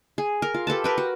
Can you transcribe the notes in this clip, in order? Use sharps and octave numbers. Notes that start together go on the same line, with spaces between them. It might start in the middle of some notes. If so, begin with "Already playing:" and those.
G#4
A#4
F4
G4 A4 B4 A5
A#4 B4 G5
F#4